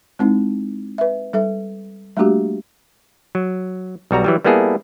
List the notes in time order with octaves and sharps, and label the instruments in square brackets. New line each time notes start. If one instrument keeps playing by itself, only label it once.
[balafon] G#3 C4 D#4 E4
B4 E5
G3 A4 E5
G3 A3 A#3 D4 F#4 G4
[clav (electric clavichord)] F#3
B1 G3 F#4 A#5
E3 F#3 G3
G3 A#3 B3 E4 G#4 A4